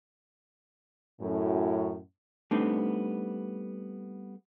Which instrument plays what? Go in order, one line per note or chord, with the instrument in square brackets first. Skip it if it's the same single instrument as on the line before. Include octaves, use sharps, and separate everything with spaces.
[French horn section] F#2 A2
[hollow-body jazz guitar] G3 A3 B3 C4 D4 D#4